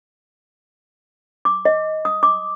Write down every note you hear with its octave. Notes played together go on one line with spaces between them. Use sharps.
D6
D#5
D#6
D6